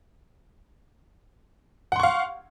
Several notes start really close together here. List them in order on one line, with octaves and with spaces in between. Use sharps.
F#5 C6 C#6 F5